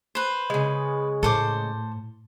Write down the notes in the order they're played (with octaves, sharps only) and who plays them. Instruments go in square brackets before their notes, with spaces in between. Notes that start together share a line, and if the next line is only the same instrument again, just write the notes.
[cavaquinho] B4 C5
[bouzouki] C#3 G#3
[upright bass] A2 [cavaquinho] A4 C5 D6